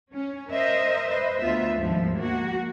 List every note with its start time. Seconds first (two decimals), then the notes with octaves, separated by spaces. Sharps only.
0.14 C#4
0.52 A#4 C5 D#5 E5
1.09 B4 C5 D#5
1.40 D2 B3 F4 E5
1.78 D#2 G#2 F3 G3
2.19 A#3 F#4